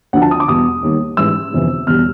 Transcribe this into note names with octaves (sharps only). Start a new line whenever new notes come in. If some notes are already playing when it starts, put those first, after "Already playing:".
D2 D3 F3 F#5
A5
D#6
D6
E2 B2 G3 D#6
D#2 D#3 G3
A1 G#2 E3 G3 E6
G1 F2 C3 E3
E1 E2 B2 G3 F6